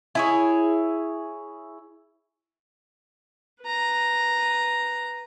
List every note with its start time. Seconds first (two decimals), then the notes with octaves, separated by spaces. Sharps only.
0.15 E4 G#4 C#5
3.62 B4 A#5